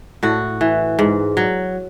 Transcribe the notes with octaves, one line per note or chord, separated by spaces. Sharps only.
A2 F#4
E3
G#2
F#3